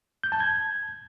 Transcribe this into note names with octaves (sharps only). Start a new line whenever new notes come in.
G6
A5
G#6